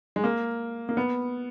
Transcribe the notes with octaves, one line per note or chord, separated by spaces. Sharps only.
G#3
A#3
A#3
B3